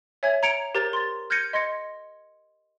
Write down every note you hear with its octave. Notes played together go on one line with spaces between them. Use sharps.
C#5 E5 G#5 G#6
A#5 G#6 C#7 D7 F7
G4 A#4 C5 A#5 A6
C6 A6
F6 G6 G#6 A#6 C#7 D#7
D#5 C6 G#6 A#6 C#7